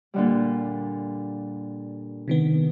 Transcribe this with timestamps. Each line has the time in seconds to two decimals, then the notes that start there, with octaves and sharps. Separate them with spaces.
0.14 A#2 D3 G3
2.28 C3 D#3 B3